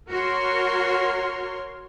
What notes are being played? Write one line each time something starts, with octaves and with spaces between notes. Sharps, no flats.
F#4 A#4 C#5 C6